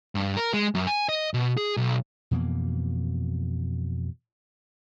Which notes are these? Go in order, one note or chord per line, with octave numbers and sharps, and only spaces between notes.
G2
A#4
G#3
F#2
G#5
D#5
B2
G#4
B1
F2 B2 E3 A#3